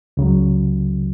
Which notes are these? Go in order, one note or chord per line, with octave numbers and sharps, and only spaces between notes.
C#2 C#3 F#3